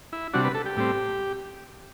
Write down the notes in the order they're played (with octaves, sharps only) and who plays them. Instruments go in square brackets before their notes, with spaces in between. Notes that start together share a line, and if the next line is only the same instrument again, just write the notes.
[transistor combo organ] E4
C3 G3 D4 F#4
B4
A4
G4
A2 G3 C4